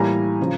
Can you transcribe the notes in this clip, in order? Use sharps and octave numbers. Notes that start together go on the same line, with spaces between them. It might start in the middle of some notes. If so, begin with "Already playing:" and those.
Already playing: A2 E3 G3 A#3 G#5 A#5
C#3 F3